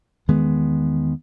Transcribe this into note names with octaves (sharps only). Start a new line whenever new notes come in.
E2 D#3 G#3 B3